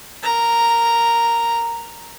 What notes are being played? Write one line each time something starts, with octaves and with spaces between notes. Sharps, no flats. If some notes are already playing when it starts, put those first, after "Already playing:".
A#4 A#5